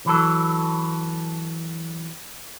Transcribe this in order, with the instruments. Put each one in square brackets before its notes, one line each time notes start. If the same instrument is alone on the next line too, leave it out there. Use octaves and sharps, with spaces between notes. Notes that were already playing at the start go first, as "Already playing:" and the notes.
[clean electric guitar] E3 F#3 A4